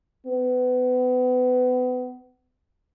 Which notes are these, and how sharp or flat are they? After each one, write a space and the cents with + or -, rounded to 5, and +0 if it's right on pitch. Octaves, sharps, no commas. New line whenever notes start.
B3 +30